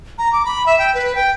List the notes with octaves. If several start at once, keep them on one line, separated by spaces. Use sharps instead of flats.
A#5
D6
B5
E5
G5
B4
G5